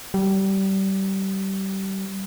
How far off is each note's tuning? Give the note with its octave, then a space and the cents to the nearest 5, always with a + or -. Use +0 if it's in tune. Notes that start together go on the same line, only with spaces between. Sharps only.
G3 -25